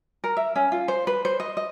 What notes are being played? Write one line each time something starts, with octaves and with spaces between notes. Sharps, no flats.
A#4
E5
C#4
F4
C5
B4
C5
D#5
D#5